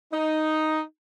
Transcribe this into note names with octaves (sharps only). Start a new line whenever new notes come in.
D#4